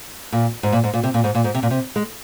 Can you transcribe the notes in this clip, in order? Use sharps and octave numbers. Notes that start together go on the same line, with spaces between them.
A#2
G#2
A#2
G#2
A#2
C3
A#2
G#2
A#2
G#2
C3
A#2
C3
G#3